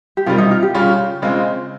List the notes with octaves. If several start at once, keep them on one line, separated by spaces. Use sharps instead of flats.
G4
C3 D#3 G3 F4
D#4
F4
G4
C#3 G3 C#4 F4
C#3 G#3 C4 F4